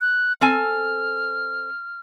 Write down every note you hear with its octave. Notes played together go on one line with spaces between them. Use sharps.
F#6
C4 A4 G#5 F6